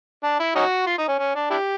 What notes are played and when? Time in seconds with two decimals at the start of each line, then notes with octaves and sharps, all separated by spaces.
0.23 D4
0.40 E4
0.56 C#4 D#4 F#4
0.86 F4
0.98 D#4
1.08 C#4
1.19 C#4
1.35 D4
1.50 D4 E4 G4